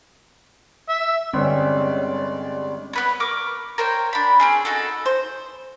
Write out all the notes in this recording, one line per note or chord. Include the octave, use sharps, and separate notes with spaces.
E5
G1 G3 G#3 C4 C#4 C#5 D5
B3 B4 C#5
A#4 C#6 D6
A#4 C5 C#5 G5
D4 B5
C4 C#4 G#4
D#4 F#4 A4
C5